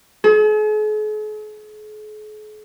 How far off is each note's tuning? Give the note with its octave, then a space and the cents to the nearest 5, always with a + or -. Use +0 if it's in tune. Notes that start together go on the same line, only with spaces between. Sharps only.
G#4 +45